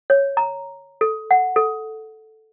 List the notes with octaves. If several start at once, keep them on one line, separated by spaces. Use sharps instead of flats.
C#5
A#5
A4
F#5
A4